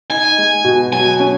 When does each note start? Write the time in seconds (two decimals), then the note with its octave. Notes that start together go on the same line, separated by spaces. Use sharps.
0.10 D#4 G#5
0.38 G#3
0.64 B2
0.92 F#3 G#5
1.20 C#4